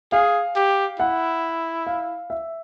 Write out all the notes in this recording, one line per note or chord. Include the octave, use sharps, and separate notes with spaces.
G#4 F5
G4
E4 F#5
F5
E5